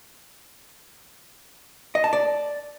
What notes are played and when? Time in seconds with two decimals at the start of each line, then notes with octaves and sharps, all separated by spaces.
1.95 D#5
2.04 A5
2.13 D5